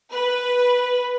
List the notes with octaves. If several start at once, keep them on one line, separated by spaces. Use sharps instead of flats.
B4